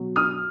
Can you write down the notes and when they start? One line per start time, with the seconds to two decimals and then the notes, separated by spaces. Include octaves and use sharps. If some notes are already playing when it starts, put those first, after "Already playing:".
Already playing: B2 F#3
0.16 D#6 F6